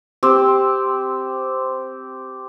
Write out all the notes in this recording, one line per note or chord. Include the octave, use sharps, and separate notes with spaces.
C4 G4